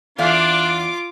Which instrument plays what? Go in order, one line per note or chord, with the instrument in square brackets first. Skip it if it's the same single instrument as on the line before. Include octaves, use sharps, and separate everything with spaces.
[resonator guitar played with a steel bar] E2 D5 F5 [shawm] D4 [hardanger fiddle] F4 D6